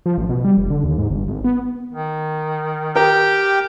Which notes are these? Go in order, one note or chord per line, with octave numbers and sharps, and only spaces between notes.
F3
A1
B2
G3
F1
D3
D#2
G#2
G1
G#1
B3
D#3
G4 A#4 G5